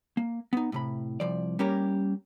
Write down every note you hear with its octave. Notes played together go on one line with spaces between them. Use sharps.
A#3
B3 D#4
A2 C3 B5
C2 F3 D5
G3 A#3 C#4 G4 A#4